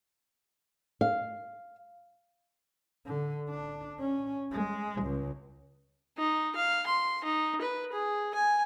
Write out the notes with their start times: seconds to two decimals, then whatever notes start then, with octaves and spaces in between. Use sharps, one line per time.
1.01 F5
3.06 D3
3.50 D4
4.00 C#4
4.52 G#3
5.02 C#2
6.18 D#4
6.56 F5
6.87 C6
7.24 D#4
7.61 B4
7.92 G#4
8.34 G#5